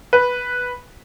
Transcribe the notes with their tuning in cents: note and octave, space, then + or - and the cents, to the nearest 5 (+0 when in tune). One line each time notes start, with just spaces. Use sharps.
B4 -5